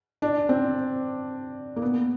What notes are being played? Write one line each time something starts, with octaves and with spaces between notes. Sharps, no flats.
D4
C4
A#3
B3